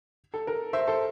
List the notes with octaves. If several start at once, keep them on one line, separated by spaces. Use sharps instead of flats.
A4
A#4
C5 E5
A4 C5